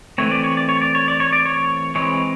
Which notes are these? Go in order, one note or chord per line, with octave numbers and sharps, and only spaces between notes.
E3 A3 C4 C#5
D5
C#5
D5
C#5
D5
C#5
D5
C#5
D5
C#5
E3 G#3 C4 C#5